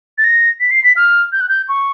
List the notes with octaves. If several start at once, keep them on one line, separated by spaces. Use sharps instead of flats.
A6
A#6
B6
C7
B6
F6
G6
F#6
G6
C#6